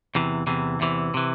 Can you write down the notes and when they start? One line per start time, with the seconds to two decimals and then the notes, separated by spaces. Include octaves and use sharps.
0.15 E2 C3 E3
0.47 E2 C3 E3
0.80 E2 C3 E3
1.14 C3 E3